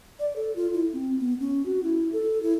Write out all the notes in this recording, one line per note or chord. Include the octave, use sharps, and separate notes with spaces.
D5
A4
F4
E4
C4
B3
C#4
F#4
E4
A4
E4